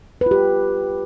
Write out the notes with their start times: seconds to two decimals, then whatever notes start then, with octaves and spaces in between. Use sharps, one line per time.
0.21 B4
0.26 F4
0.31 G4